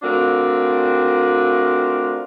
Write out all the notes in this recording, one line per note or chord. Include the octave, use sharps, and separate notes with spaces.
A3 C4 D4 F4 F#4 A#4